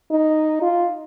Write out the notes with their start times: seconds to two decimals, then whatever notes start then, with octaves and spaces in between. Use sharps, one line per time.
0.11 D#4
0.62 F4